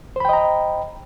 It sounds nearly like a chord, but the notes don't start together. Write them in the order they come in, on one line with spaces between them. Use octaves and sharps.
C5 B5 G5 D#5 A#5